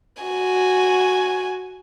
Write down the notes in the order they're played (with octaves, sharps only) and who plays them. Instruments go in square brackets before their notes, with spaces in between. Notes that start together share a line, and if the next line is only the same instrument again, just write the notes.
[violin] F#4 G#5